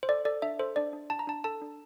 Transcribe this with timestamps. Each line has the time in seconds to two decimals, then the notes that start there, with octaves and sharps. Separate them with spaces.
0.03 C5
0.09 A4 D5
0.25 A4 D5
0.42 D4 E5
0.59 A4 C5
0.76 D4 D5
0.93 D4
1.10 D4 A5
1.19 A#5
1.27 D4 A5
1.44 A4 A5
1.61 D4